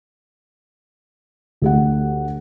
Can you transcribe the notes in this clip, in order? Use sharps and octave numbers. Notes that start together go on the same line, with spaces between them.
D2 G4 F#5